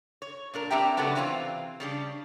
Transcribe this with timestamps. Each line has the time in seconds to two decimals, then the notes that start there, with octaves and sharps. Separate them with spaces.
0.22 C#5
0.54 A#2 D4 A#4
0.71 C4 D4 G4 A#4 E5 G5
0.97 C#3 F#3 A3 B3 D4
1.15 C3 E3 C4 E4 F4
1.80 C#3 G3 D4